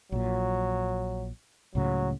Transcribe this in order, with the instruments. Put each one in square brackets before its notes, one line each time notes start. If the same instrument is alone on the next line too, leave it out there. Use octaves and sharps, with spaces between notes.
[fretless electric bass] A#1 A#2 [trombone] F#3
[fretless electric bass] C#2 A2 C#3 [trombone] F#3